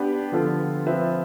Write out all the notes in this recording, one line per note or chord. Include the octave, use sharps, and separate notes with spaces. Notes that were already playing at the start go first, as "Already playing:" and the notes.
Already playing: B3 D4 G4 B4
D3 F3 B3 F4 A4
F3 C4 F4 B4 E5